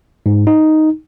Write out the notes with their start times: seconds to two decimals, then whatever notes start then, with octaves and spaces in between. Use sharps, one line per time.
0.26 G#2
0.47 D#4